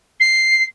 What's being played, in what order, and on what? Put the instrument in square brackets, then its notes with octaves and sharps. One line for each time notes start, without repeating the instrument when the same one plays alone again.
[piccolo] C7